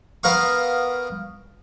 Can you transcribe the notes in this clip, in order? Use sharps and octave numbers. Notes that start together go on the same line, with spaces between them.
B3 A#4 F5 C#6